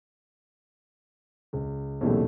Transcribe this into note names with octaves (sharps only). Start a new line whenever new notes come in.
C#2
B1 E2 A#2 C#3 G3 A3